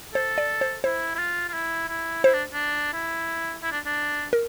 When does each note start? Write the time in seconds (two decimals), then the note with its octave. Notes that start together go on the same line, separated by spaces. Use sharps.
0.14 A4 C5
0.38 D5
0.61 C5
0.84 E4 C5
1.15 E4
1.19 F4
1.49 F4
1.54 E4
1.89 E4
2.24 E4 C5
2.33 D4
2.53 D4
2.93 E4
3.63 E4
3.71 D4
3.86 D4
4.33 A#4